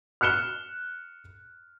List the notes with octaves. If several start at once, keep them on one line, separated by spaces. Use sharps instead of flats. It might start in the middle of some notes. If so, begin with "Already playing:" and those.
F6 F#6 C#7 E7 G7